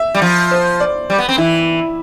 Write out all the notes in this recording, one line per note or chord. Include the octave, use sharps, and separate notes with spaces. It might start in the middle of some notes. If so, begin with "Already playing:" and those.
Already playing: E5
G3
F3
C5
D5
G3
B3
C4
E3 E4